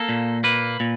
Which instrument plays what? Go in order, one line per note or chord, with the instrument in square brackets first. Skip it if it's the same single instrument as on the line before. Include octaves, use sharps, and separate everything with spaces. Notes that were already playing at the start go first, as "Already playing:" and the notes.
Already playing: [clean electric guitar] A#3 A4
A#2
A#3 B4
A#2